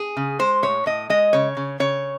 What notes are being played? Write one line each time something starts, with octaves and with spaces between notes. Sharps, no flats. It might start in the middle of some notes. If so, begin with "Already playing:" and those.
Already playing: G#4
C#3
G#3 C5
A2 C#5
A2 D#5
G#3 D#5
C#3 C#5
C#3
C#3 C#5